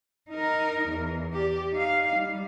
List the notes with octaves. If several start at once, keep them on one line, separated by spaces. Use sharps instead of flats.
D#4 A#4
E2
G4 D5
D#4 F5
G3